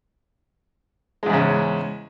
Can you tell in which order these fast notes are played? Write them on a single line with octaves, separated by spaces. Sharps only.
G#3 E2 G#2 C#3